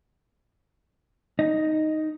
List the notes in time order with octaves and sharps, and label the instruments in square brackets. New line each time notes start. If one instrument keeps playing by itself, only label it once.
[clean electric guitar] D#4 D#5